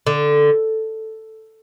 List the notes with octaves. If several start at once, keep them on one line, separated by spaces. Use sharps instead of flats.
D3